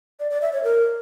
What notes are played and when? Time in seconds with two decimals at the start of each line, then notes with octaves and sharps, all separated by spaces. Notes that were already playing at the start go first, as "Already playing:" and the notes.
0.20 D5
0.31 D5
0.42 E5
0.53 C#5
0.64 A#4